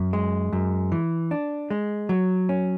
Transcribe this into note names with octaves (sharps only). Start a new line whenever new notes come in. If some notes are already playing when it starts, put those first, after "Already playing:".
Already playing: F#2
G#3
F#2
E3
D4
G#3
F#3
C#4